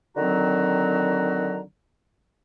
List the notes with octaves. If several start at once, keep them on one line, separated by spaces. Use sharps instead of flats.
D3 D#3 F#3 C4 F#4 A#5